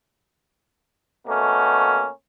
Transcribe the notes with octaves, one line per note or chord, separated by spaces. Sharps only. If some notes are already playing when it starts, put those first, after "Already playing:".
B2 A3 A#3 C#4